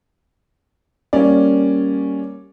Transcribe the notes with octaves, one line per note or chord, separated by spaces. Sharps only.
G3 A#3 C#4 D5